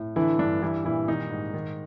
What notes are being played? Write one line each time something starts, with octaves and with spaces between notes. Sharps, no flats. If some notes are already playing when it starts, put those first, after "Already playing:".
Already playing: A2
D3 E3 E4
G2 D4
E3 G3 E4
A#2 E3 E4
D#3 D#4
G#2
D#3